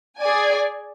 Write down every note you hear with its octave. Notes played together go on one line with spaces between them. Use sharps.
G#4 D5 G#5